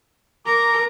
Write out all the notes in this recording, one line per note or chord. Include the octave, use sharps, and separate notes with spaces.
A#4 A#5 D6